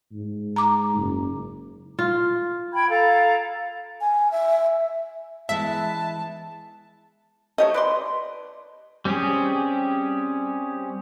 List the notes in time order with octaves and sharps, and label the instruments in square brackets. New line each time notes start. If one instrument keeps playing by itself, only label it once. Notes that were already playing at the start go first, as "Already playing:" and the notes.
[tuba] G#2
[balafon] A#5 D6
[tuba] F#1
[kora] F4
[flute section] G5 B5 G#6
A4 F5 A#5
[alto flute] G#5
E5
[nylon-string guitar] E3 G#3 B3 [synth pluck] E5 [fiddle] A5
[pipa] A3 G4 C#5 [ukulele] D#5
[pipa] B4 D5 C6
[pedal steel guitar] G3 C4 C#4 G4 G#4